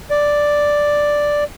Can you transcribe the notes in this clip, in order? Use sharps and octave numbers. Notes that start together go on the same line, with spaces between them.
D5